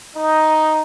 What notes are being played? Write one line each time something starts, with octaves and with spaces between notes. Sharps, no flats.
D#4